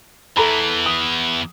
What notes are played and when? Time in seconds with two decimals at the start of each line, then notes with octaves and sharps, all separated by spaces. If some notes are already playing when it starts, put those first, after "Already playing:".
0.37 E2 E3 A4 A#5 B5
0.86 D#6